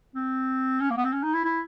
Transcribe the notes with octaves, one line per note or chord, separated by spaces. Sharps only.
C4
C#4
A#3
B3
C4
C#4
D#4
E4
E4